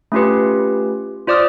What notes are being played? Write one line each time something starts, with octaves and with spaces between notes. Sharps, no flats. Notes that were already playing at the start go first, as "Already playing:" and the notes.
A3 C#4 F4 G4 B4
F4 C5 D5 D6 D#6 F6